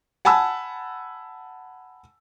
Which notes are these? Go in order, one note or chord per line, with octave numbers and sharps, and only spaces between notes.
F#5 G#5 A5 B5 E6